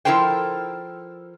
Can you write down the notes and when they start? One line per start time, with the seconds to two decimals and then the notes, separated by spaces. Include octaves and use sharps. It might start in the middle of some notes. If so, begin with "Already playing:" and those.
0.05 F3 E4 A4 A#4 C5 G5